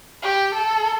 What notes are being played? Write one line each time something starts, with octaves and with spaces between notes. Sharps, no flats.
G4
A4